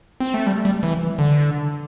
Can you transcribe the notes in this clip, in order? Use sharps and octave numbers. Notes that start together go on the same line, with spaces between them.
C4
A3
G3
G3
E3
D3